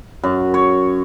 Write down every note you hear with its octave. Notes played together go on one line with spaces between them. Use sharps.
F#2
C#5